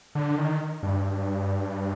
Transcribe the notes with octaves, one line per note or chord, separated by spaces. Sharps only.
D3
D#3
G2